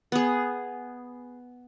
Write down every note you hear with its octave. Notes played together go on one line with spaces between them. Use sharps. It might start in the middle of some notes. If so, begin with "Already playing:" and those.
B3 G#4